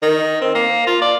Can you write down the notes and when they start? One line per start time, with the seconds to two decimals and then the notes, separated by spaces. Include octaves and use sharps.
0.03 D#3
0.41 C4
0.55 A#3
0.87 F4
1.01 D5